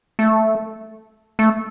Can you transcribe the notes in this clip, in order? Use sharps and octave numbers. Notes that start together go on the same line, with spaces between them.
A3
A3